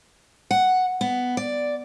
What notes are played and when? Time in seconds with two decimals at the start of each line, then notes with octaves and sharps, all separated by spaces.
0.51 F#5
1.01 B3
1.37 D5